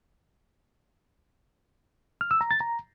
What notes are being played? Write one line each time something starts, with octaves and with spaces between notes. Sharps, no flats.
F6
E6
A#5
A6
A#5